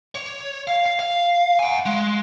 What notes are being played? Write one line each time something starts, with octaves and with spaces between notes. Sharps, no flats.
C#5
F5
F5
F5
F#5 G#5
G#3